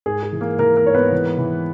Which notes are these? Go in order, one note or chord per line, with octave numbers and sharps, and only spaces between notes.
G#2 G#4
G#4
E3
A#3 A#4
E3 A#3 A#4
A#3 A#4
G#2 C#5
B3 B4
E3
E3